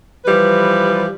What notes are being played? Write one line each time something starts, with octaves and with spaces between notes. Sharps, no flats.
E3 F3 G3 B4